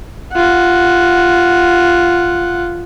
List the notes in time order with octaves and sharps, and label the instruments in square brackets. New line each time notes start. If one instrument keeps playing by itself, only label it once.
[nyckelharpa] F4 F#5